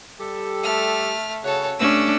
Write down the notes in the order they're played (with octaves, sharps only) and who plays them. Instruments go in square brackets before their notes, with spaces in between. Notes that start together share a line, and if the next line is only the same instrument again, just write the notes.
[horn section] G3 G4 A4
[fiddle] A3 F6
[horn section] C#3 F#4 [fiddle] A4 C#5
[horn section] G2 [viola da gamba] A3 C#4 D4 [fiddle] E6